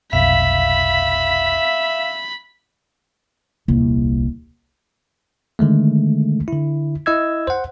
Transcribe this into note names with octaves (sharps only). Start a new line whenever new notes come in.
F1 B1 E5 F5 B5
D#1 C2
D3 D#3 G#3 A3
D3 E4
E4 D#5 E6 G#6
C5 F#5